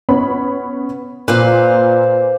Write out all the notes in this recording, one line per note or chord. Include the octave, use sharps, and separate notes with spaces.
B3 C#4 B5
A#2 B4 C5 F5